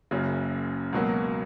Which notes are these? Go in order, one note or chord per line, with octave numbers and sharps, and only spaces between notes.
F#1 F#2 C#3
C#2 B2 F#3 A#3